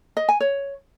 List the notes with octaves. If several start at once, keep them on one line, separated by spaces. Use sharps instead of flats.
D#5
G#5
C#5